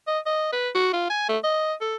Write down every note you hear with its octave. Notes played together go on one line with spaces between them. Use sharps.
D#5
D#5
B4
F#4
F4
G#5
A3
D#5
A4